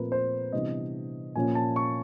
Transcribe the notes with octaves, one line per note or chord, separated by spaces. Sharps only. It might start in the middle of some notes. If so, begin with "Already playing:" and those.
Already playing: A#2 F3 A3 C4 A#4 B4
C5
C3 E3 G3 B3 D4 D#5
A#2 F3 A#3 C#4 G#5
A5
C#6